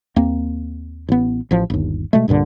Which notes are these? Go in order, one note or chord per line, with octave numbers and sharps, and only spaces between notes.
D#2 A#3 C4
A1 B3
A1 F3
G1 D#2
B2 G#3 A3
C2 G2 A#2 D3